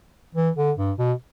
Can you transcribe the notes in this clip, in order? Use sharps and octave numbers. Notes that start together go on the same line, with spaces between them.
E3
D3
G2
B2